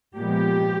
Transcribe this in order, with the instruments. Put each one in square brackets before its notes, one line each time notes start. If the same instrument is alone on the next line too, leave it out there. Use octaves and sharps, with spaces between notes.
[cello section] A#2 F3 G#3 B3 G4